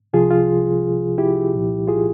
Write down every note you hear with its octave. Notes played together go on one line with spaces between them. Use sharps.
C2 C3 F3 F4 G#4
F4
E4 G4
C2 A#2 F3
F4 G#4